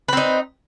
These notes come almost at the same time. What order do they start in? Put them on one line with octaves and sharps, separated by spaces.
B4 C4 D#4